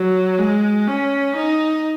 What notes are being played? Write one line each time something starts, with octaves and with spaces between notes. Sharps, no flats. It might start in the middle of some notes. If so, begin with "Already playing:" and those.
Already playing: F#3
G#3
C#4
D#4